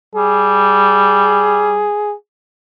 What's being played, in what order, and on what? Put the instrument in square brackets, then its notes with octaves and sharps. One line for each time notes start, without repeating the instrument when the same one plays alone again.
[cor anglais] G3 [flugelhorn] G#4